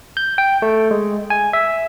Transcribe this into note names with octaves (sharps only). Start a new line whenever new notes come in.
G6
G5
A3
G#3
G#5
E5